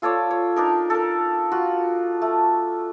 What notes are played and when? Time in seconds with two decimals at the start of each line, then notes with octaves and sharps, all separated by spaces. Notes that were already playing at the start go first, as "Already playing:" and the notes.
0.02 F4 A4 C#5 D5
0.31 C#5
0.56 D4 D#4 A#4
0.90 A4 A#4
1.52 F4 F#4
2.21 A3